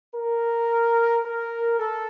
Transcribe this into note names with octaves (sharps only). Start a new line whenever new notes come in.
A#4
A#4
A4